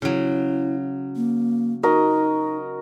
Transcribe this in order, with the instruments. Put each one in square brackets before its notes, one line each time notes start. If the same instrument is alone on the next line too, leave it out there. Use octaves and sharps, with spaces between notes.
[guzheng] C#3 F#3 [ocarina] E4
[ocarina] A#3
[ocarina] D#4 [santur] F#4 A#4 D#5